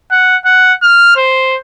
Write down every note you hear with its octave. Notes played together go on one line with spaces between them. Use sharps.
F#5
F#5
F6
C5